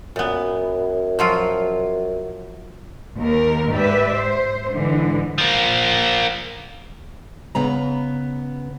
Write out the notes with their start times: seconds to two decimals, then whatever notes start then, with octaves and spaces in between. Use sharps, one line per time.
0.16 F#2 A#2 B3
1.19 F3 F#3 F4
3.17 D#2 A#4
3.71 G#2 G4 B4 D5 E5
4.15 C5
4.72 G#2 D3 E3
5.38 F3 A#3
7.55 C#3 B3 A#5